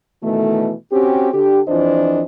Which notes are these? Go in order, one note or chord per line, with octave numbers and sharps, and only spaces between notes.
B2 D#3 E3 A3
C4 C#4 F#4 G4
D3 G4
F2 E3 F3 D4 C5 D#5